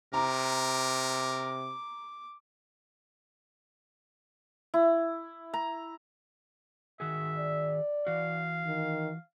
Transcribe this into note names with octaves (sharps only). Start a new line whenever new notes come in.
C3 A#4 A#5 D6
E4
A#5
D#3 F#4 G#4 E5
D5
E3 F#4 F5
D#3